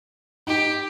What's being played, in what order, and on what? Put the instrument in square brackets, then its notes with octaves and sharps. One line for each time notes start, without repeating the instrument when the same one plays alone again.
[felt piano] D#4 [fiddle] G4